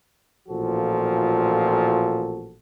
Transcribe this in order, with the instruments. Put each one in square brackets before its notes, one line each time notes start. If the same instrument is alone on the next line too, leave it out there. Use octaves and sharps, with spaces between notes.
[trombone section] A1 A#2 F3 F#4 A4